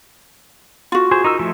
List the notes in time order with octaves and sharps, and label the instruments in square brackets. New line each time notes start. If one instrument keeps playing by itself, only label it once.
[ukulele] F4 F#4
[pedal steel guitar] G#4 C5
D#4 A#4 E6
F3 A3 E4